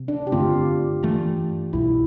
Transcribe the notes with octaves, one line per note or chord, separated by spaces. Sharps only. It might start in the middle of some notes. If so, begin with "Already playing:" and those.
Already playing: C3 C4
D4
G4
G2 D3 A3 C4 F4
G2 E3 A3
C2 B2 G3 E4